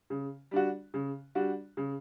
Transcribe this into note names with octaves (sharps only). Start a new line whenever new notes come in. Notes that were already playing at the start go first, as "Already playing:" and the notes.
C#3
G3 D4 F#4
C#3
G3 D4 F#4
C#3